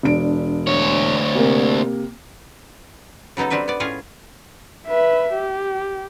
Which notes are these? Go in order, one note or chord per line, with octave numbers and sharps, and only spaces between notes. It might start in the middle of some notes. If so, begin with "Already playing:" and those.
E1 D4 D7
D2 C#5
C3 A#3
C#3 F#3 B3 D#4 A4
G3 C4 D4 B4 E5
B3 D5
A2 C#4 F4 G#4 F5
B4 E5
G4